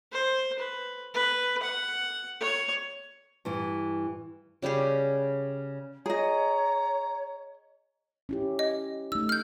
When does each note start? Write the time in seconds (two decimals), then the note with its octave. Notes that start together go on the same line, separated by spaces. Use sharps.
0.12 C5
0.59 B4
1.14 B4
1.62 F#5
2.40 C#5
3.45 G2 E3
4.62 C#3 G3 G4 G#4
6.06 G#4 C#5 D#5 A#5
8.29 C#4 E4 G4
8.59 D#5
9.12 A3 D#4 E6
9.29 F6 G6